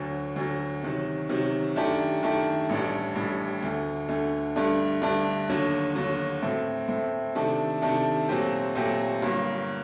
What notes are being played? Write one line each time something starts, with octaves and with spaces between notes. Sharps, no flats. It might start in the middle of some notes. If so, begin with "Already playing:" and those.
Already playing: D2 D3 F#3
D2 D3 F#3
C3 D#3 F#3
C3 D#3 F#3
F#2 D#3 A3 D4 G4
F#2 D#3 A3 D4 G4
A1 A2 G3 D4
A1 A2 G3 D4
D2 D3 A3
D2 D3 A3
G2 D3 A3 D4
G2 D3 A3 D4
D#2 D3 F#3
D#2 D3 F#3
A2 A3 C4
A2 A3 C4
C3 D#3 A3 D4 A4
C3 D#3 A3 D4 A4
A#2 F#3 A3 C4 G4
A#2 F#3 A3 C4 G4
G1 G2 F#3 A#3